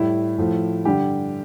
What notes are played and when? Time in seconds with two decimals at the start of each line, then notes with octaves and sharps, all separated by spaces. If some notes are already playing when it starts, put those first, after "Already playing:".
Already playing: A2 G3 E4
0.38 A2 F3 A3
0.85 G2 D3 G3 G4